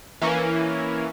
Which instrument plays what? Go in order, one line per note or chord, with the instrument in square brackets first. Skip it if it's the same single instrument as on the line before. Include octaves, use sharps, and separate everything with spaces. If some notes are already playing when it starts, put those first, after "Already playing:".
[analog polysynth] E3 A#3 C#4